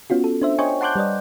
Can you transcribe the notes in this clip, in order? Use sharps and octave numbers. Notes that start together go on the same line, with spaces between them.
B3 C#4 F4 F#4
A4
D4 C5 E5
C5 C#5 D#5 G5 G#5 C#6
F#5 A5 C6 D6 F#6 G6
G3 B4 D5 D#5